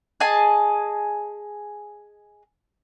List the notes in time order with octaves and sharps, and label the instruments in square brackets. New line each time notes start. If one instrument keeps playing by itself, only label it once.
[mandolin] G#4 D#5 G#5 A5